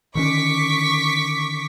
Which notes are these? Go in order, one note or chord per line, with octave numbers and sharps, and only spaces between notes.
D3 D#3 C#4 C#6 D6 B6